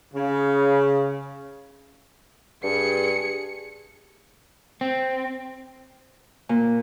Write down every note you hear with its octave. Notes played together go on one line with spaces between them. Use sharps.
C#3
G2 G#4 C#7
C4
A#2